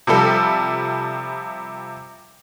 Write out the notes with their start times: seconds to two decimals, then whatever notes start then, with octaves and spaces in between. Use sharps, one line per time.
0.07 C3 F3 G3 A4